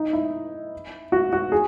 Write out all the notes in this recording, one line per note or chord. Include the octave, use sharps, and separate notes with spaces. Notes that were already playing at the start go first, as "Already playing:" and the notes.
Already playing: D#4
E4
F#4
F#4
G#4